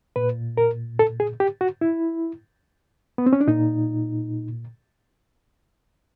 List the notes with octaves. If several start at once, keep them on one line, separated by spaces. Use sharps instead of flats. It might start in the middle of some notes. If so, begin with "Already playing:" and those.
A#2 B4
A#4
A4
G#4
G4
F#4
E4
B3
C4
C#4
D4
A#2 D#4